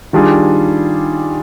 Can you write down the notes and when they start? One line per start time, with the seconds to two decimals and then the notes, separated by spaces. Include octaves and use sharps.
0.13 D#3 G3 D4 F4 G#4